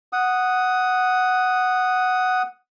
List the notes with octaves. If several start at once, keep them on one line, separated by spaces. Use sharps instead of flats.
F#5 D#6